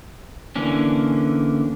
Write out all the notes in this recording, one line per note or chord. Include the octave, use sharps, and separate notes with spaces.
D3 E3 A#3 C#4 D4